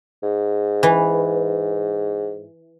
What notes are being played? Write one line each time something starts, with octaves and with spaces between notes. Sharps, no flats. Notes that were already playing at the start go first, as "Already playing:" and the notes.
G#2
E3